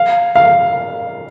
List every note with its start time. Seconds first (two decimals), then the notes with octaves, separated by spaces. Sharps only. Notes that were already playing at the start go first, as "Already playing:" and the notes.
Already playing: F5
0.35 F5